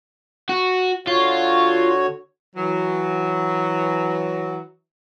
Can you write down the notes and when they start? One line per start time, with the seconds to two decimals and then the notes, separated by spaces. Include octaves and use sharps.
0.49 F#4
1.07 D3 F4 F#4 C#5
2.56 E3 F#3